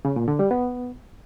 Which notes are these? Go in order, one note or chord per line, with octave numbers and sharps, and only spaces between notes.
C#3
A#2
D3
G3
B3